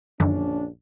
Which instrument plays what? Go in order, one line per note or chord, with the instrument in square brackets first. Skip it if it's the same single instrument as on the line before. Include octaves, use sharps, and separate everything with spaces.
[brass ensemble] A#1 C#4 D4 [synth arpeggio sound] F#2 D3 D#3